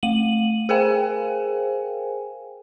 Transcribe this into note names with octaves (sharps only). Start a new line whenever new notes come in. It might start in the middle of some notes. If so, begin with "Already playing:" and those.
A3 D#7 F#7
G#4 A#4 C5 F5 G5 G#5